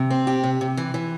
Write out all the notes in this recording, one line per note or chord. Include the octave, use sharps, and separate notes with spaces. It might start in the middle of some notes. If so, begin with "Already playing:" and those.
Already playing: C3
C4
G4
C3
C3
E3
E3